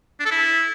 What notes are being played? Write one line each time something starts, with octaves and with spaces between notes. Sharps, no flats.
D4
A4
E4